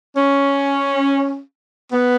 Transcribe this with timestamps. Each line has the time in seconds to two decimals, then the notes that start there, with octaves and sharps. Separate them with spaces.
0.17 C#4
1.93 B3